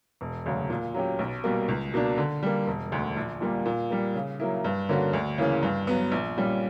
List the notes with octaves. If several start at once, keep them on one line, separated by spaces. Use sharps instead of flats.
E1
D2 C#3 F#3
A#2
F#3 C#4 G4
B1
B2 G3 A#3
C#2
B2 A#3 D4
D3
G3 A#3
E1
D2 D3
A#1
A#2 G3 A#3
A#2
G3 A#3
C#3
F#3 A#3 E4
G2
D3 A#3 C#4 F#4
D2
C#3 E3 A#3 C#4
G2
F#3 B3
A#1
A#2 G3 C#4